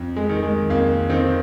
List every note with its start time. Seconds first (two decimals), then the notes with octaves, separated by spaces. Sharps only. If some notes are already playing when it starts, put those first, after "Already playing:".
Already playing: F2
0.17 G#3
0.29 D#3
0.43 G#3
0.70 F2 A#3
1.10 D#3 C4